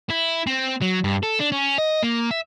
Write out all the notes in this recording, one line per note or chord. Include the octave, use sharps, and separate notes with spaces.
E4
C4
F#3
G2
A4
D4
C#4
D#5
A#3
E5